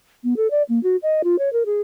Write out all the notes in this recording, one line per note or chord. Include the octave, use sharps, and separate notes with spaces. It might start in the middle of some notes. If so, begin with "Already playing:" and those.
B3
A4
D5
A#3
F#4
D#5
F4
C#5
A#4
G#4